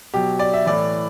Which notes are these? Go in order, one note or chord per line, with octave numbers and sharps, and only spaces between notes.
B2 F#3 G4
D5
E5
A2 E3 D5